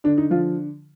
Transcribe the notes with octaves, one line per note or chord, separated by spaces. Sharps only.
D3 D4
D#4
F3 F4